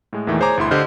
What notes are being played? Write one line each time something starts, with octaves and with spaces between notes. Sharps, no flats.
A2 G#3
E2 A#2 D#3 E3 A3
G#4 C5 C#5 G#5 A#5 D6
G1 D2 E4 C6
D3 G4 C5 D#5 F6 G6